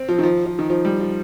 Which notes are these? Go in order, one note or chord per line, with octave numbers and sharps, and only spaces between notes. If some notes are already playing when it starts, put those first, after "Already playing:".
Already playing: C4
F3
D#3
F3
F3
D#3
F3
G3
F3